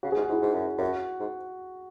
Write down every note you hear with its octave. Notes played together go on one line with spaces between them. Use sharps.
C#3 F#4
G#4
G#2
F#4
G#2
E4
G#2
F#2
F#2 F#4
G#2